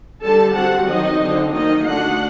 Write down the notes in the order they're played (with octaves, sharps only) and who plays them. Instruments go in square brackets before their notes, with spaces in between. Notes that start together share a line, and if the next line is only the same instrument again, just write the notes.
[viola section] D3 G3 D4 A4 A5
G3 C4 F#4 F#5
D#3 F#3 C4 D#4 D#5
D3 F#3 C4
D#3 F#3 A#3 D#4 D#5
D3 A3 D4 F#4 F#5